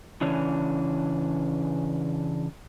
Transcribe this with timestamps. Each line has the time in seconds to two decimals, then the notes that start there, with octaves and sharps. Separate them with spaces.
0.21 C#3 E3 C#4 D4